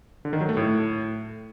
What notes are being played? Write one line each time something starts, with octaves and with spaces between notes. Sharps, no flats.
D3
D#3
F#3
A3
A2